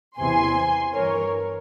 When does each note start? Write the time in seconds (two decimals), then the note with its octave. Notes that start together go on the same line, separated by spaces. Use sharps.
0.17 E2 C3 E3 G#5 C6
0.93 G2 E3 A#4 C#5